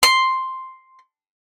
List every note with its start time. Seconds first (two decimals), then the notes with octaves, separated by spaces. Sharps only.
0.03 C6